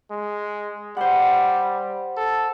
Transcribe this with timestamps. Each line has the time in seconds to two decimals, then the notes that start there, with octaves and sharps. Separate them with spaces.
0.11 G#3
0.97 G3 C5 F#5
2.17 A4